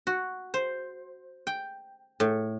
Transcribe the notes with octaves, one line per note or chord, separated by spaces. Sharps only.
F#4
C5
G5
A2